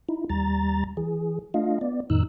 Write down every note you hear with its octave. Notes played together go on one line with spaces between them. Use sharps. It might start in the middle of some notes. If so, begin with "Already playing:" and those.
D#4 E4
D#2 G3 A#5 A6
E3 G#4
A3 D4 F4 D#5 F5
B3 D5
F2 A2 D#3 D#4 E6 F#6